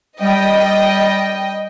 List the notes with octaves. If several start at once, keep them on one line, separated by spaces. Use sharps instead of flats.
G3 D#5 G5